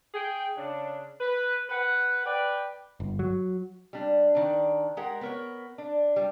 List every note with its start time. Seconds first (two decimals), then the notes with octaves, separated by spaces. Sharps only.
0.14 G#4 G5
0.57 C#3 D4
1.20 B4
1.70 B4 F#5
2.25 B4 D5 G5
3.00 G1
3.19 F#3
3.93 G3 D4
4.35 D#3 D4
4.97 G#3 G4 A#4 F#5
5.21 B3 A#4 C#5
5.78 D4
6.16 G3